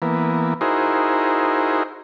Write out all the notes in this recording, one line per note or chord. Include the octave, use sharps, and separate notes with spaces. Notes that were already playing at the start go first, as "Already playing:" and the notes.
E3 A#3 B3
D#4 E4 F#4 G#4 A#4 C5